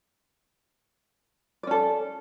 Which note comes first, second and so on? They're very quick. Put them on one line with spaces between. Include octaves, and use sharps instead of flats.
D5 C#4 A4